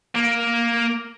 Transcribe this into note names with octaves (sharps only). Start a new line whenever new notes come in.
A#3